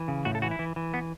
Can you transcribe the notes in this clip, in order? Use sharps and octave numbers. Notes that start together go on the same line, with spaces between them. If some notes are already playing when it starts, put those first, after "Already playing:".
Already playing: E3
C#3
A2 F#4
A4
E3 F#4
E4
E3
E3
B3